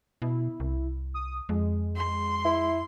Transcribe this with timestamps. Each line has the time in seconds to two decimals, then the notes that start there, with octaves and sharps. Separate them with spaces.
0.22 B2 E4
0.60 C2
1.14 D#6
1.49 F2 G#3
1.96 C6
2.45 E4